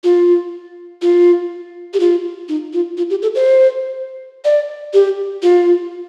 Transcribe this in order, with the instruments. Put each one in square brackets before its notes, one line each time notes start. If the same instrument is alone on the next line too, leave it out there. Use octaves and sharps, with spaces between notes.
[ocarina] F4
F4
G4
F4
D#4
F4
F4
G4
A4
C5
D5
G4
F4